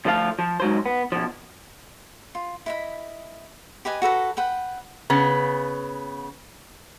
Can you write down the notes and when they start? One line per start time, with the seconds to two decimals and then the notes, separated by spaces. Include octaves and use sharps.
0.05 D2 F3 A3 F4 F5
0.39 F3
0.60 G#2 F#3 C5
0.86 B3
1.12 B2 F3
2.35 F4
2.66 E4 D#5 B5
3.85 G4 B4 D#5 G#5
4.02 F#4 A4 B4 A#5
4.37 B4 F#5 G5
5.10 C#3 B3